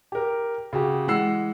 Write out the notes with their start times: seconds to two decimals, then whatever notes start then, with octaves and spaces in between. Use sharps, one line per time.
0.12 G4 A#4
0.73 C#3 F#4 G4
1.07 E3 G#3 F#5 E6 C7